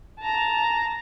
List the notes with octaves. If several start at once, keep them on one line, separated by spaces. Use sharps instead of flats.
A5 A#5